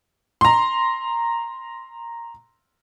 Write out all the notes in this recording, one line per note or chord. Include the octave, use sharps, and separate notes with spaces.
A#5 C6